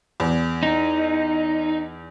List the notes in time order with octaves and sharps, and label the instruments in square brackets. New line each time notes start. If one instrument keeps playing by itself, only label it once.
[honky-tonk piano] E2
[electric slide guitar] D#4